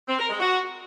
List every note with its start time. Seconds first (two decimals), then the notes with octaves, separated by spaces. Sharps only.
0.08 C4
0.19 A#4
0.30 G#3
0.40 F#4